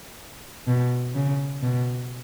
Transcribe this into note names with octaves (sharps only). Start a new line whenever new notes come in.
B2
C#3
B2